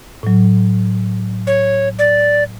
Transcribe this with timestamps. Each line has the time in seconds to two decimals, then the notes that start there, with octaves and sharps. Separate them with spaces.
0.23 A2 F#3
1.47 C#5
1.99 D5